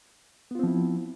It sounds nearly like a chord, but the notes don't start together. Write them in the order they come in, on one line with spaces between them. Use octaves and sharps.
B3 F4 C4 F3 E4